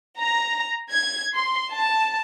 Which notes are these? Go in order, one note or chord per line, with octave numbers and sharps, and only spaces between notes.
A#5
G#6
C6
A5